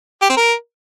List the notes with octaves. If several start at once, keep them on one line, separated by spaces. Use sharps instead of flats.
G4
C4
A#4